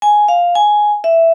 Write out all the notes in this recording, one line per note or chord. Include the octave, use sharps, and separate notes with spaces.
G#5
F5
G#5
E5